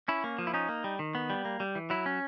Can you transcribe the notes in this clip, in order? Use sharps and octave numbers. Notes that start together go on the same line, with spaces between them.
C#4 E4
A#3
F3
E4
C#4 D#4
A#3
G3
D#3
B3
G3
A#3
G3
E3
F#3 E4
C#4